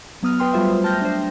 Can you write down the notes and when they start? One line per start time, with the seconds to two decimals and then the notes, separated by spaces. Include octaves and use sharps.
0.23 F#3 B3 D#6 F6
0.39 B4 G5 C6 F6
0.53 F#3 G3 A3 F4 C5 E5
0.84 G5 A5 F6 G6 A#6
1.01 D4 C5